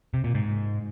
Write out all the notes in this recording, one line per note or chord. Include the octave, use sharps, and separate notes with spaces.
C3
A#2
G#2